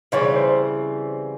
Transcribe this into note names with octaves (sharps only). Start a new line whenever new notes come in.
C#3 E3 G3 C4 C#5
C5